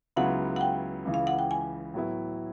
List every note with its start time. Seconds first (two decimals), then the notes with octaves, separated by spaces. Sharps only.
0.16 C#2 C#3 F#3 B3 E4 F#5
0.56 F#5
0.61 G5
1.05 C#2 C#3 E3
1.14 F5
1.27 F#5
1.39 G5
1.51 G#5
1.94 A2 F#3 B3 E4